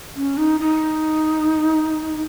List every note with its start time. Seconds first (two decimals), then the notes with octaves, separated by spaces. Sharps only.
0.16 C#4
0.38 D#4
0.60 D#4